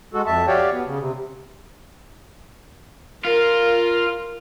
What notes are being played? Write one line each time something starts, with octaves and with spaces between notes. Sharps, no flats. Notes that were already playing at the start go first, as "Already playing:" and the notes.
G#3 F#4 A4
F2 E5 A5
F#4 G4 C#5 D5 F5 G5
B3
C#3
C3
F4 A#4